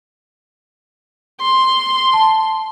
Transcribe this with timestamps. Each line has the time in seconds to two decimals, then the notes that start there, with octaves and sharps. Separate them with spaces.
1.41 C6
2.13 A5